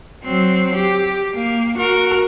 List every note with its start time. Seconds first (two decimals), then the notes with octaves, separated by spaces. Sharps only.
0.24 F#3 C4
0.76 G4
1.35 A#3
1.78 F#4 A#4